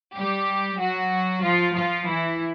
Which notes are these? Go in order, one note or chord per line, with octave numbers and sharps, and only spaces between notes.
G3 G4
F#3 F#4
F3 F4
F3 F4
E3 E4